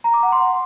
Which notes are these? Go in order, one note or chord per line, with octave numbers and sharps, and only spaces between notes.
A#5
D6
F#5
C6